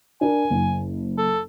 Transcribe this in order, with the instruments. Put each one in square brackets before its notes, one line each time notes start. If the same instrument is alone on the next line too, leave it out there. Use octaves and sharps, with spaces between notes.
[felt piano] D4 A#4 [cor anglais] G#5
[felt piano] F#1
[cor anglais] A4